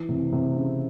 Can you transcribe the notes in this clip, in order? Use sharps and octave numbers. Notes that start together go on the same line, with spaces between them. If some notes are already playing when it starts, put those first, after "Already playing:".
Already playing: E3
C3
C3
C#3